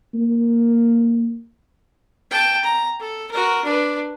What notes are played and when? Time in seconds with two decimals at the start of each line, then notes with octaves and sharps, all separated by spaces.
0.15 A#3
2.31 G5 A5
2.64 A#5
3.00 A4
3.31 F#4 A#4
3.64 D4 B4